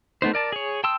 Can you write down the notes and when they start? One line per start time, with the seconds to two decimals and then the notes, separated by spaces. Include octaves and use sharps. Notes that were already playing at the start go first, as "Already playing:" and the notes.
0.22 A3 B3 D#4 C5
0.33 A#4 D5 A5
0.52 G#4 C#5
0.84 G5 A5 C6 D#6 E6